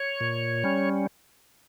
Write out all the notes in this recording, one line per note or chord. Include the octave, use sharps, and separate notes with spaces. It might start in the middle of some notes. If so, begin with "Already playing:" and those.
Already playing: C#5
A#2
G3 C#4